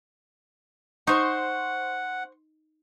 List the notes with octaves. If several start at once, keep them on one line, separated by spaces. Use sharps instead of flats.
D#4 C5 F#5 C#6